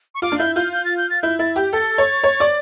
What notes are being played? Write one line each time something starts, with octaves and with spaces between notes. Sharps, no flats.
C#6
F4 D6
D4
E4 G6
F4 G6
G6
A6
G6
A6
E4 G6
E4 A6
G4 G6
A4 A6
C#5
C#5
D5